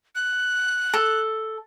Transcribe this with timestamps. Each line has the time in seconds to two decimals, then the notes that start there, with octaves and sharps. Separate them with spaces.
0.15 F#6
0.94 A4